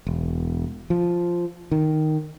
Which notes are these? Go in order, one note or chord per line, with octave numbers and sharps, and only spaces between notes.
E1
F3
D#3